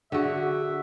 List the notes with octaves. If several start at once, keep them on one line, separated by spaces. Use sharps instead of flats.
D3 F#4 G#4 E5